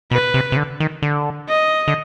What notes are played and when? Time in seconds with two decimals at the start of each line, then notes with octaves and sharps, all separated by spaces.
0.11 B2 B4
0.34 C3
0.52 C3
0.57 D3
0.80 D#3
1.02 D3
1.49 D#5
1.88 D3